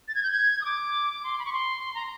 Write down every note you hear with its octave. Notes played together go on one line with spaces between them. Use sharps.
A6
G#6
G6
G#6
D#6
D6
C6
B5
C#6
C6
A#5